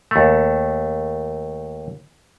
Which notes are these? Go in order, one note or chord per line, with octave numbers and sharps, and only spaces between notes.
D#2 A3